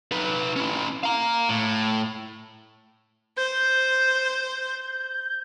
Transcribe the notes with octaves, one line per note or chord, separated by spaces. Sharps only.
D#4 B4
C#4 E4
F5 A#5
A2
C5 G6